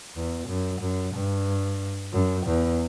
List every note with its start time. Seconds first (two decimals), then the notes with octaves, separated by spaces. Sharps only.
0.16 E2
0.48 F#2
0.81 F#2
1.14 G2
2.13 F#2
2.46 E2